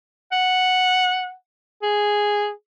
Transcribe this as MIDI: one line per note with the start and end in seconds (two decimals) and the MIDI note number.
0.32 1.33 78
1.83 2.51 68